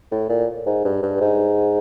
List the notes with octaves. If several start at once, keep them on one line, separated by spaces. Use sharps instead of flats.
A2
A#2
G#2
G2
G2
G#2